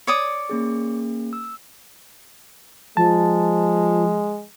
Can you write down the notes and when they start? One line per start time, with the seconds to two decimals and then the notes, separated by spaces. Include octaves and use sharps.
0.07 C#5 D5 D#6
0.49 A#3 C#4 G#4
1.33 E6
2.97 F3 G#3 A5